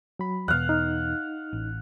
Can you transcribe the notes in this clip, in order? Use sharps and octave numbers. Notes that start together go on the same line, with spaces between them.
F#3 B5
E2 B2 F5 F#5
D#4
A1